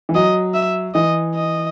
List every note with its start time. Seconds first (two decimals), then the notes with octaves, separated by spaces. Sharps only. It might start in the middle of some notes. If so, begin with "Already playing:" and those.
0.09 E3
0.15 F#3 D#5
0.54 E5
0.95 E3 D#5
1.35 D#5